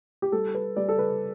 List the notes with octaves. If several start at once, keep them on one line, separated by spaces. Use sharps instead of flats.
G4
G3 A4
B4
G3 D5
A4
B4